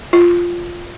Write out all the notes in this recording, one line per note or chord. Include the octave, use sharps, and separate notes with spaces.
F4